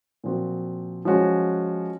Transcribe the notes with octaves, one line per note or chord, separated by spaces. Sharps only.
A#2 F3 C4 F#4
F3 G#3 C#4 F#4